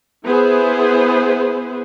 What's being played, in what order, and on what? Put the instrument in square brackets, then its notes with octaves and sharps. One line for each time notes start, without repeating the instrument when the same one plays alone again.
[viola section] B3 E4 G#4 B4 C5